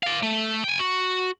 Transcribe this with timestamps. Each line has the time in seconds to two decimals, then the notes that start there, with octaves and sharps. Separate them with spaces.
0.03 D5 F5
0.23 A3
0.64 G5 G#5
0.79 F#4